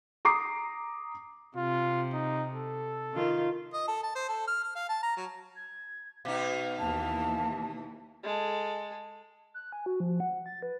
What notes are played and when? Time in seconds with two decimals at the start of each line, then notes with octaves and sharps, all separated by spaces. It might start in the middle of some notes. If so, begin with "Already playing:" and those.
0.25 A#5 D6 D#6 C7
1.57 C3 F4
2.13 D#4
2.55 A4
3.13 D#3 F4
3.74 D#5
3.88 A4
4.03 A5
4.15 C5
4.29 A4
4.48 F6
4.64 F6
4.76 F5
4.89 A5
5.03 A#5
5.17 F#3
5.56 G#6
6.25 B2 D#4 F5
6.79 D#2 E3 A5
8.24 G#3 A4
9.54 F#6
9.72 G#5
9.86 F#4
10.00 F3
10.20 F#5
10.46 A6
10.63 B4